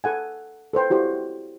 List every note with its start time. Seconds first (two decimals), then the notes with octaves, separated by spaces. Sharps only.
0.04 A4 F#5 G#5
0.73 A4 B4 C5 G5
0.90 E4 F#4 G4 C5